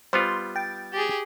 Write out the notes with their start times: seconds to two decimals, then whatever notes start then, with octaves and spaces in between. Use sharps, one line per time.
0.13 G3 B3 F4 C5 C6
0.56 G5 A6
0.93 G4 G#4